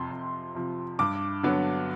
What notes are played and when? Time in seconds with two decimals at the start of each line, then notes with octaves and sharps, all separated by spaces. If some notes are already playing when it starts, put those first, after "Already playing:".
Already playing: F2 C3 F3 C6
0.11 F2
0.55 C3 F3
0.99 G2 D6
1.43 D3 F#3 B3